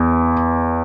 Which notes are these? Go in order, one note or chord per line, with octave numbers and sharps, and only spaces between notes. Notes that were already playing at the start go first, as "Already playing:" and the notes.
Already playing: E2